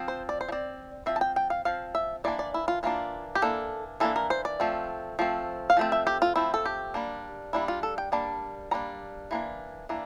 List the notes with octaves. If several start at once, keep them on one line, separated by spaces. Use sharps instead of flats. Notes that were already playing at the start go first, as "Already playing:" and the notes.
Already playing: F3 C4
C5
D5
C5
F3
C4 D5
F3 C4 E5
A5
G5
G5
F5
F3 C4 F5
E5
E3 A#3 D4 D5
D5
E4
F4
E3 A#3 D4 F4
G4
E3 A#3 D4 A4
E3 A#3 D4 A4
A#4
C5
D5
F3 A3 C4
F3 A3 C4
F5
F3 A3 C4
E5
G4
F4
F3 A3 C4 E4
A4
G4
G3 A#3 D4
G3 A#3 D4 E4
F4
A4
G5
G3 A#3 D4 A5
G3 A#3 D4 A#5
E3 A#3 D4
E3 A#3 D4